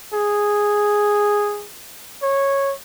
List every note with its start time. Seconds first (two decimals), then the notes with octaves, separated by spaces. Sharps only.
0.13 G#4
2.22 C#5